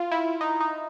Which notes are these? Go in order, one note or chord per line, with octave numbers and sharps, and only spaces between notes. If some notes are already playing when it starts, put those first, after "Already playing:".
Already playing: F4
E4
D#4
D#4